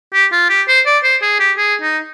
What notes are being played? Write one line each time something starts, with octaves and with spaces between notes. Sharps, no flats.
G4
F4
G4
C5
D5
C5
G#4
G4
G#4
D#4